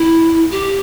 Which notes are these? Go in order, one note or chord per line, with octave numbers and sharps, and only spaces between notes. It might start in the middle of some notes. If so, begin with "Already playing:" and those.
Already playing: E4
G4